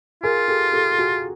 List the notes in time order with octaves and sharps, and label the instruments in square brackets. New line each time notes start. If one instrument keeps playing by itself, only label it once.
[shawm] F4 [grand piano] G#4 A#4
[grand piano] G4 A4
G4 A4
A4
F#4 G#4